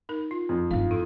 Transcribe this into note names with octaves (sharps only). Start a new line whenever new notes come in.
D#4 A#4
F4
F2
G2 D#4 F5
E4 A4